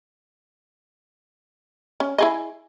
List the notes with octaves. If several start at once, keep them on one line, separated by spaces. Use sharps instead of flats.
C#4
E4 G#4 D#5